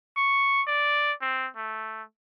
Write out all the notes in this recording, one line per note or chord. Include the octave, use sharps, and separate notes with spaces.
C#6
D5
C4
A3